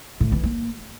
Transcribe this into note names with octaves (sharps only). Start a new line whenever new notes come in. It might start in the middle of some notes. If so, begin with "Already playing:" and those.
A2
E3
A#3